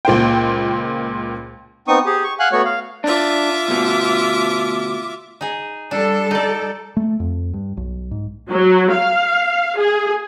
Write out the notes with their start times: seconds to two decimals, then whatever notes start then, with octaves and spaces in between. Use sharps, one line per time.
0.05 C#2 A#2 C5 G5
1.88 B3 C4 D#4 C#6 D#6
2.06 G4 G#4
2.24 C#6
2.39 F5 F#5 G#5 F#6
2.52 A3 B3 F#4 C#5
2.65 F5
3.04 D4 F4 E5 D6
3.68 D2 B2
5.41 D#4 G#4
5.91 G3 D4 A4
6.31 D#4 D5
6.97 A3
7.20 F2
7.54 G2
7.77 B1
8.11 G#2
8.50 F#3
8.92 F5
9.79 G#4